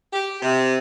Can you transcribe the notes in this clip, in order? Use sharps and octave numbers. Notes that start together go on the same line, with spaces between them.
G4
C3